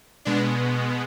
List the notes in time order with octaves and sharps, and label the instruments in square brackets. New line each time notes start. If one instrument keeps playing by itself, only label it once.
[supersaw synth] B2 G#3 B3 D4